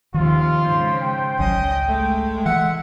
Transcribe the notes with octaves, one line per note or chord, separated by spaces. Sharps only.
D#2 C3 D#3 F3 F4
G#2 C#3 C5
G5
G#1 C#2 F#3 C#4 D#5
G#3 A3
E3 E5 F#5